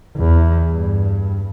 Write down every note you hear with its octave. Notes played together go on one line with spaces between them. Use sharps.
E2
G2